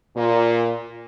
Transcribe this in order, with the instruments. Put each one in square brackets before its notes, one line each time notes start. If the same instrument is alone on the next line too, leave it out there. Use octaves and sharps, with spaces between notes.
[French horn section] A#2